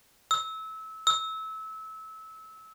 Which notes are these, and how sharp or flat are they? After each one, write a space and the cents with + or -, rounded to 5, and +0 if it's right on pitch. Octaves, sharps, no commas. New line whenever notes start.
E6 -25
E6 -25